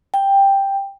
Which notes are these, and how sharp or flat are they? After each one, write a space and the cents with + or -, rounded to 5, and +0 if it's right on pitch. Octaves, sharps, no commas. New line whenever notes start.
G5 +5